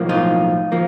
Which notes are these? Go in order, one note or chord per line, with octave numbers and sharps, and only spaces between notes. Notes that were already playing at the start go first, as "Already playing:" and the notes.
Already playing: B1 A2 F3 A#3
D#4 F4
F3 A#3